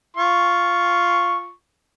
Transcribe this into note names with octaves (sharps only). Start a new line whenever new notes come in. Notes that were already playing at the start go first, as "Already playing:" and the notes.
F4 C#6